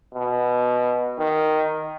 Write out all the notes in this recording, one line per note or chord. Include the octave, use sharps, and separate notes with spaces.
B2
D#3